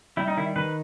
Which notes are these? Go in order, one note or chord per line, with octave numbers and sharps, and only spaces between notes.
G3 E4
D#4
D#3 E4
D#3 B4